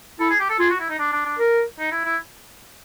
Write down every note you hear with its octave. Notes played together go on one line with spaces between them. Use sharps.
E4 A4
G#4
G4
A4
F4 G#4
F#4
E4
D#4
D4
D4
D4
A#4
D#4
E4
E4